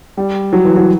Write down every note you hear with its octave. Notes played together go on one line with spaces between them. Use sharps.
G3
F#3
E3
F#3